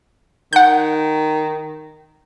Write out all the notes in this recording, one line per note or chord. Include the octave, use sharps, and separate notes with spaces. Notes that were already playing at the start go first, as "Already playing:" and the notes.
D#3 F#5 G6